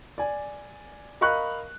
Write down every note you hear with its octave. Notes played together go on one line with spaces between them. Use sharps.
D5 G#5
A#4 D#5 F5 B5 C#6 F#6